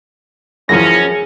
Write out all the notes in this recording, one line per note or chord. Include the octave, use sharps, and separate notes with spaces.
F#2 E3 F3 C#4 G#4 A#6